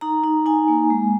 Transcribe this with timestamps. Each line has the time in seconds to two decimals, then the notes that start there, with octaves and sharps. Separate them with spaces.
0.01 D#4 A#5
0.24 D#4
0.46 D#4 G#5
0.68 A#3
0.90 G#3